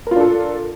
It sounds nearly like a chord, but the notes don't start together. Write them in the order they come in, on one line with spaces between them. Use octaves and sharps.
A#4 F4 D4 A4